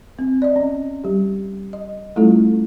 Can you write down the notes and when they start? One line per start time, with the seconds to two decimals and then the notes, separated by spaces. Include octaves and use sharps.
0.19 C4
0.42 D5 D#5
0.56 C#4
1.04 G3 G4
1.73 D#5
2.16 G3 A3 C#4 E4 F4 A4